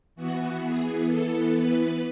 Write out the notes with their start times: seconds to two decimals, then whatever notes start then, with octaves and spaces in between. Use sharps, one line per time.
0.15 E3 B3 F#4
0.61 G#4
1.06 A4
1.52 B4